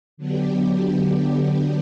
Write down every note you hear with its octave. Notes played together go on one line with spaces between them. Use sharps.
D3 F#3 B3 D4 G4